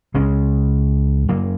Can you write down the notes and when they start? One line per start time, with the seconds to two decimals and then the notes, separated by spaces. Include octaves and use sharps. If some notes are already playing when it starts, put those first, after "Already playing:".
0.14 C#2 C#3 G#3 C#4
1.28 F#2 F#3 A#3